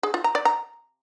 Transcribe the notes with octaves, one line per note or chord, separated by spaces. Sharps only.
G#4
F4
A#5
D5
A#5